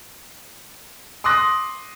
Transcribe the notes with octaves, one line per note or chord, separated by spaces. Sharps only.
C6 D6 D#6 F#6 A#6